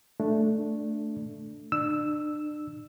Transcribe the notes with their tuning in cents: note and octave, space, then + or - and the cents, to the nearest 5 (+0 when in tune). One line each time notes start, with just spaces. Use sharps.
A3 +0 D4 +0
D4 +35 E6 +0